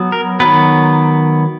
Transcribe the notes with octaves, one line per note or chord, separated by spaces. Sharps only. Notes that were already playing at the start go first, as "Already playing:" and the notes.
Already playing: F#3 B3
A#4
D#3 F#3 B3 B4